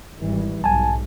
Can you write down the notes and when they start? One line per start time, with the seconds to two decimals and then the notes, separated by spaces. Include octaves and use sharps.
0.19 G#1 E3 G3
0.64 B1 G#2 G#5 A5